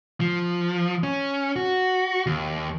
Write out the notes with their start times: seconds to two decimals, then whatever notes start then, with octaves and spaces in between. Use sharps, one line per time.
0.21 F3
1.03 C#4
1.56 F#4
2.26 D#2